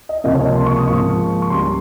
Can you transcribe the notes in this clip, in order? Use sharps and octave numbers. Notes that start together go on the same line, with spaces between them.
D#5
C#2 C3 F3 A#3 D#5
C#5
D#5
C6
C#6
D#6
G#2 F3 A#3 C#6
C#6
C#2 C#3 G3 C6